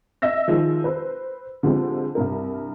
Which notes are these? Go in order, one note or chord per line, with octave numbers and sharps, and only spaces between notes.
D#5 E5 E6 A#6
D#3 F3 G#3
B4 C5
D3 F3 G3 G#3 C4
C2 G2 A#4